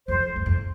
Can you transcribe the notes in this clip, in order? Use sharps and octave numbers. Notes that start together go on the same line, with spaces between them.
F2 C5
E2
F2